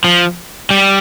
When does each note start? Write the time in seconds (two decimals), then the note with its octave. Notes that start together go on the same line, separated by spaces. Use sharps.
0.04 F3
0.70 G3